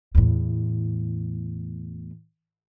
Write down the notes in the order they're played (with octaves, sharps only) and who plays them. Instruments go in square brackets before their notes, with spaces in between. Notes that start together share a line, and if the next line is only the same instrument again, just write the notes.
[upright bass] E2 A2